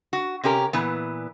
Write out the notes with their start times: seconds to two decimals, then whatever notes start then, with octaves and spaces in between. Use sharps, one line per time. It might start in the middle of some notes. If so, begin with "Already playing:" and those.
0.13 F#4
0.44 C3 C#4 G4 A#4
0.73 A#2 E3 B3